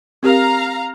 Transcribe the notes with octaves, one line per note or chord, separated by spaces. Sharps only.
C4 G4 A#4 F5 A#5